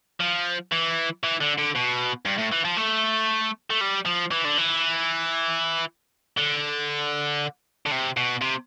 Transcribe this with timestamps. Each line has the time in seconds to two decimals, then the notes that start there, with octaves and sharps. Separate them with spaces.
0.21 F3
0.72 E3
1.24 E3
1.41 D3
1.58 D3
1.75 B2
2.26 G2
2.38 A2
2.52 E3
2.65 F3
2.77 A3
3.70 A3
3.81 G3
4.06 F3
4.31 E3
4.45 D3
4.58 E3
6.37 D3
7.86 D3
7.91 C3
8.17 B2
8.42 C3